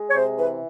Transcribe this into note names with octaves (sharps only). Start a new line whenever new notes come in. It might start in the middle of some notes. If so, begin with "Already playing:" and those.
Already playing: G#3
C#5
C3 C5
E3 B4